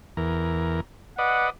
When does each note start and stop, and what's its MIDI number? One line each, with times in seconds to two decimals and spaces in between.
0.17 0.80 40
0.17 0.80 70
1.18 1.50 71
1.18 1.50 74
1.18 1.50 75
1.18 1.47 78